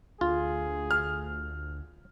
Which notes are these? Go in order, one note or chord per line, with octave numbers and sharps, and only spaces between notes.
D2 F4 G#4
F6